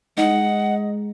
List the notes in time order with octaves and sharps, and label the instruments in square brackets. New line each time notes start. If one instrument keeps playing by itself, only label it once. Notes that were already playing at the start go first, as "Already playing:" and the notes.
[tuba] G#3 [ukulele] D#4 [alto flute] D#5 [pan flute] F#5